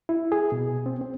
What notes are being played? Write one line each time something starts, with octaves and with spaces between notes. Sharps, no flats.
E4
G#4
B2
C4
C4